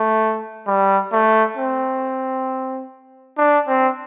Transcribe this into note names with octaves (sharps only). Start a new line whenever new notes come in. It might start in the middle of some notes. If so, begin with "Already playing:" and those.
Already playing: A3
G3
A3
C4
D4
C4